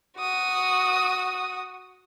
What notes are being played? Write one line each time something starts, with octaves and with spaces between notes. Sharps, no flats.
F#4 D#6